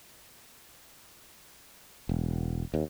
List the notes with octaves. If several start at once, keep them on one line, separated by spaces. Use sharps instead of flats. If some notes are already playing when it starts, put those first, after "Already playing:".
E1
D#2